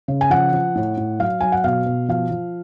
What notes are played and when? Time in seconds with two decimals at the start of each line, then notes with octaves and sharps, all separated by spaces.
0.08 C#3
0.21 G#5
0.30 F3 F#5
0.53 F3
0.75 A2
0.97 A2
1.19 F#3 F5
1.41 F#3 G#5
1.52 F#5
1.64 B2 F5
1.86 B2
2.09 F3 F5
2.31 F3